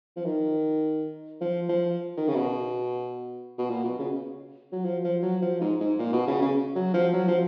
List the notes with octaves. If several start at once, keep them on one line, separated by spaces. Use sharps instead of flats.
F3
D#3
F3
F3
D#3
C#3
B2
B2
A#2
B2
C#3
F#3
F3
F3
F#3
F3
G#2
G#2
A#2
B2
C#3
C#3
F#3
F3
F#3
F3